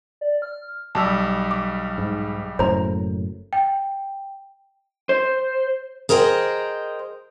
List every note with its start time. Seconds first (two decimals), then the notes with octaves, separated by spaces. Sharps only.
0.21 D5
0.42 F6
0.95 B1 G3 A5 E6
1.51 D6
1.98 G#2
2.59 F#1 F#2 A2 C5 A#5
3.53 G5
5.09 C5
6.09 G#4 A#4 C5 D#5 G5